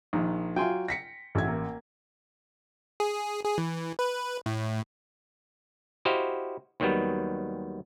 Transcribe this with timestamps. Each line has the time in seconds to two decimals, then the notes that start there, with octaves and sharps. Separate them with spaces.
0.13 A#1 D#3
0.56 F#3 F4 G5 G#5 C6
0.88 A#6 B6 C#7
1.35 A1 A3 G#6
1.48 A#3
3.00 G#4
3.44 G#4
3.58 E3
3.99 B4
4.46 A2
6.05 E4 F#4 G4 C5 D#5 F5
6.80 D#2 D#3 F#3 G3 B3